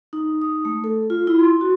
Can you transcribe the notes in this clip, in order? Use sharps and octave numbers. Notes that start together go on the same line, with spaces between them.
D#4
D#6
A3
A4
F4
E4
C6
F#4